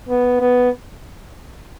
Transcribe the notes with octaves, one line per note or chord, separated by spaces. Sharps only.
B3
B3